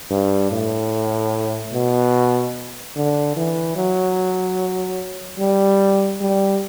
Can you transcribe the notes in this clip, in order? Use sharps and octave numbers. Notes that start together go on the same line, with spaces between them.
G2
A2
B2
D3
E3
F#3
G3
G3